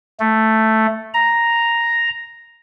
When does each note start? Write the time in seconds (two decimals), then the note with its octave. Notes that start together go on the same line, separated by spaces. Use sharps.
0.20 A3
1.14 A#5